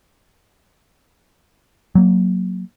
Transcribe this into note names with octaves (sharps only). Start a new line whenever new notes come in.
F#3 A#3